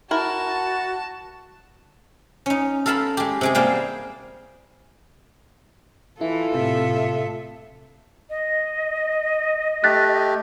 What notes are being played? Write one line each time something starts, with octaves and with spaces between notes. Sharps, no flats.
E4 F#4 A#4 A5
C#4 D#4
A4 A#4 F5 A5 B5
G#3 G4
C3 G#3 G#4
G3 A#3 G#4 C5 F5 G5
E3 E4 F4 A4
A2 C3 E5
D#5
A3 G4 F#6 A6 B6